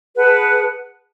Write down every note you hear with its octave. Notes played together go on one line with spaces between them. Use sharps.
G#4 B4 F#5 A5